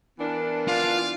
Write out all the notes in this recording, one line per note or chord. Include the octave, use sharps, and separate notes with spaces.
E3 B3 D4 A#4
F4 F5